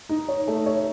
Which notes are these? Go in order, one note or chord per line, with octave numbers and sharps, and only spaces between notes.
D#4
C#5
A3
C#5